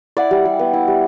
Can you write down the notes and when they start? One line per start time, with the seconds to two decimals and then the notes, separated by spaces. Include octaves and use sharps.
0.17 E4 D5 F#5
0.31 G3
0.45 G3
0.59 B3
0.73 E4
0.87 G3